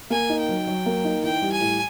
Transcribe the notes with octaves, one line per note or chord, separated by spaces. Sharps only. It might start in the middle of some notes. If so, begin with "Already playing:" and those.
A#3 G#5
D#4
G5
F#3
F#3
A#3
D#4
E3 G5
G3
G#5
A2